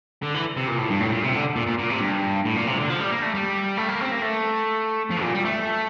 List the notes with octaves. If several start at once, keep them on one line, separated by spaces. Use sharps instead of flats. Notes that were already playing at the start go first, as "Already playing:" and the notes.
D3
E3
C3
A#2
A2
G2
A2
A#2
C3
D3
A#2
A#2
A#2
C3
G2
A2
A#2
C3
D3
F3
G3
A#3
A3
G3
A3
A#3
C4
A#3
A3
F3
A#2
G3
A3